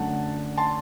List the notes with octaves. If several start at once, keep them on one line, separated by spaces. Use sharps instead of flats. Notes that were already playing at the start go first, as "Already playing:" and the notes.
Already playing: F#2 D3 A3 F#5 A5
A5 C6